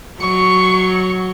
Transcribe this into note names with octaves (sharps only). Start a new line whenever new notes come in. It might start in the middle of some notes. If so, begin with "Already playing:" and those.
F#3 C#6